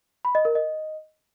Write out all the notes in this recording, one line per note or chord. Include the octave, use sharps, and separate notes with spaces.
B5
D#5
A#4
D#5